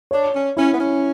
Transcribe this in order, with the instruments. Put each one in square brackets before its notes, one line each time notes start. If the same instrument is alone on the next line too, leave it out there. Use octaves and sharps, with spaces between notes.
[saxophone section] D4 [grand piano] C#5
[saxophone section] C#4
[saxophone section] C#4 [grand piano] E4
[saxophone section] B3
C#4